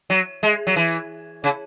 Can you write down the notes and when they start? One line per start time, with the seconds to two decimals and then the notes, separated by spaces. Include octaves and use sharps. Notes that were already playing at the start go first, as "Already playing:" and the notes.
0.10 F#3
0.43 G#3
0.67 F#3
0.76 E3
1.44 C#3